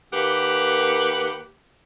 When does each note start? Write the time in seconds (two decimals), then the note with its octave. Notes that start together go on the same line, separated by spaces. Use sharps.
0.13 D#2 A#3 G4 B4 F#5